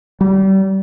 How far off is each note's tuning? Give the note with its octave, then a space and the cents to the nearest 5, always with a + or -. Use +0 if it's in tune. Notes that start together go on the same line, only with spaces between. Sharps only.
G3 -30